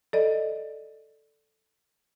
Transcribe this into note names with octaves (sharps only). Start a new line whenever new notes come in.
A4 D5 D#5